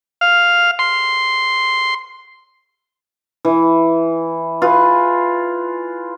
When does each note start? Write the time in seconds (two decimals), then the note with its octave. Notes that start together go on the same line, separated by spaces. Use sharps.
0.21 F5
0.79 C6
3.45 E3
4.62 F4 G#4 B4